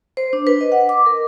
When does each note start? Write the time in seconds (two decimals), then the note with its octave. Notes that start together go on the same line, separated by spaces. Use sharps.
0.17 C5
0.33 D4
0.47 B4
0.61 D#5
0.72 F#5
0.89 D6
1.06 A#4